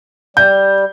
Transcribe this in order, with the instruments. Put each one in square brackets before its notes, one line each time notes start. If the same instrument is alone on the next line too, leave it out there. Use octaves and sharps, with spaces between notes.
[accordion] G3 [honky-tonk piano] G6